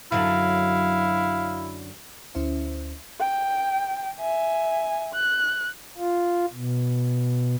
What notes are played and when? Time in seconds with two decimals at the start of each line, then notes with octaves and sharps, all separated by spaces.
0.12 F#2 D3 F#3 E4 F5
2.35 D2 C#4 E4 C5 E5
3.20 G5
4.20 E5 G#5
5.13 F#6
5.97 F4
6.53 B2